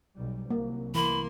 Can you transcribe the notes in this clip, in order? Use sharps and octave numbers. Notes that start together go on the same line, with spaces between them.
B1 G3
C2 F#3 A#3
E3 A#3 B5 C6